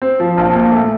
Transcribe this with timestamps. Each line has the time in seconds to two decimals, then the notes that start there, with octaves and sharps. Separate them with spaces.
0.02 C4
0.20 F3
0.38 A#1
0.55 A#2
0.72 A3